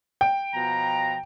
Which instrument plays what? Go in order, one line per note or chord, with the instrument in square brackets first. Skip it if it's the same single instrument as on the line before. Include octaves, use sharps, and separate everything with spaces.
[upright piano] G5
[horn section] B2 F3 A#5